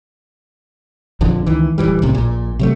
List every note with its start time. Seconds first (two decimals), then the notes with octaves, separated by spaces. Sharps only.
1.21 A#1 F2 D3 F3
1.46 C#2 D#3 E3
1.78 D1 A#1 E3 G3
2.02 C2 A2 C3
2.15 A#1 A#2
2.59 C3 F#3 A3